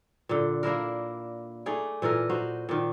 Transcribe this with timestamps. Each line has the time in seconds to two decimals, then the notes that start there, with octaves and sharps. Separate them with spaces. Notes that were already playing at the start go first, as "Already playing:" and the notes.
0.29 A#2 D3
0.63 A#3 D4 E4 A#4
1.66 A3 D#4 G#4 D5
2.02 A#2 E3 A4 A#4
2.29 D#4 F#4 C5
2.69 A#2 D#3